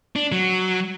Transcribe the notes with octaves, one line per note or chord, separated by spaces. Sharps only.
D4
F#3